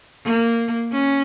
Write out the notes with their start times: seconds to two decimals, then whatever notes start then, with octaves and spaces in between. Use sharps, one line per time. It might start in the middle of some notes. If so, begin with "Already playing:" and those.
0.24 A#3
0.92 C#4